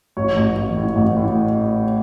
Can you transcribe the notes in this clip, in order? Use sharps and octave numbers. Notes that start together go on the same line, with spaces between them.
A1 C#5
A1
A1
A2
A1
A2